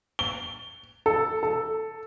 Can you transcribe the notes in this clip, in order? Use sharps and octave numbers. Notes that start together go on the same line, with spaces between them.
G7
A4
A4